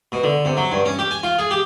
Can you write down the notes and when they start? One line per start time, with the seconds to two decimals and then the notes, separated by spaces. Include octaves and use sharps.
0.12 B2
0.24 D3
0.45 C3
0.57 F#3
0.72 G2
0.85 C#4
0.99 G4
1.11 G#5
1.23 F4
1.39 G#4
1.51 G4